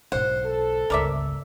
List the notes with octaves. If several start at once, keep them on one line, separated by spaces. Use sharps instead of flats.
B1 G#2 C5 F#5
A4
G1 C#2 A#4 D5 E5